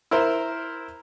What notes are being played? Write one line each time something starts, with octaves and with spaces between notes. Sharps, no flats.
E4 A#4 C5